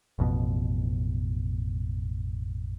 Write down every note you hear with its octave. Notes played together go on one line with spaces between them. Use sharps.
A1 F2 B2